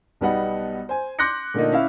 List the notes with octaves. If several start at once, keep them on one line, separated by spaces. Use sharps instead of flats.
B1 G3 B3 D#4 F#5
C5 G#5
C6 D6 F#6 G6 A#6 C#7
A#2 D3 A3 A#3 D#4
C#4 E4 E5 F5